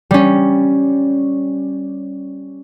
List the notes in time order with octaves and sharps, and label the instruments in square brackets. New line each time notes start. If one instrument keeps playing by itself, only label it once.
[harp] G3 C#4